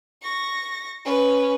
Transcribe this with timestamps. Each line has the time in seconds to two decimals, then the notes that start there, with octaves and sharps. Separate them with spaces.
0.22 C#6 A#6
1.05 C#4 B4